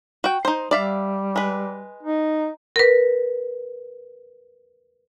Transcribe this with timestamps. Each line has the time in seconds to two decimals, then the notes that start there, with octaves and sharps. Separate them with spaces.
0.24 F#4 G5
0.45 D#4 C5
0.71 G3 D5 E5 F5
1.36 G#3 B4
2.03 D#4
2.76 A#4 B4